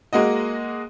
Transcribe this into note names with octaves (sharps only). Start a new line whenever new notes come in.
G#3 A#3 F#4 D#5